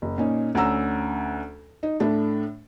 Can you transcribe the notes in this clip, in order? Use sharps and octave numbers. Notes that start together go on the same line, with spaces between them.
F#1
A#2 C#4 D#4
D2 C#4 F#5 A#5 E6
D#4
A2 A3 D4